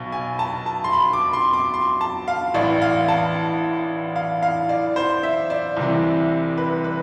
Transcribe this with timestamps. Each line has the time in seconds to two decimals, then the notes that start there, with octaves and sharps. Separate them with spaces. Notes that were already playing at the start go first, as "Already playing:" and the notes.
Already playing: B1 B2
0.12 G#5
0.39 A5
0.66 A5
0.84 C6
0.93 B5
1.13 D6
1.33 C6
1.53 D6
1.74 C6
2.01 A5
2.28 F5
2.54 A1 A2 E3 D5
2.82 F5
3.08 A5
4.16 F5
4.42 F5
4.69 D5
4.96 C5
5.23 E5
5.50 D5
5.77 C2 C3 E3
6.58 B4
6.84 B4